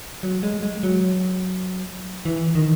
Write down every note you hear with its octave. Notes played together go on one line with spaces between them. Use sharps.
F#3
G#3
G#3
F#3
E3
D#3